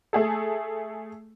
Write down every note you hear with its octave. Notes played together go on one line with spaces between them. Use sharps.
A3 G#4 A4